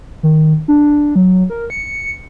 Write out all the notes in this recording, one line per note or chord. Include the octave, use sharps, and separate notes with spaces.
D#3
D4
F#3
A#4
C#7